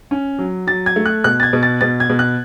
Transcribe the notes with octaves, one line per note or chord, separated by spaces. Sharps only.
C#4
F#3
F#3 A6
G#6
A3
F#6
B2 F#6
A6
G#6
B2
A6
B2 A6
G#6
B2
F#6